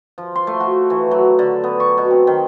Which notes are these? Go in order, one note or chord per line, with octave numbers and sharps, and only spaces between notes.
F3
C6
A3
F#4
E3
F#3
D3
B3
C#6
B2
C4
D#3